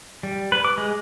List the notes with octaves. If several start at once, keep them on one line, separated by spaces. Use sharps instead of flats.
G3
B4
D6
G#3